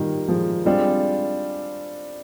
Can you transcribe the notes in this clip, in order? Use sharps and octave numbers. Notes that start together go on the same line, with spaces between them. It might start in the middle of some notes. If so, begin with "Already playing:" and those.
Already playing: D#3 F3 G3 A#3
F3 G#3
G3 G#3 C4 D4 F4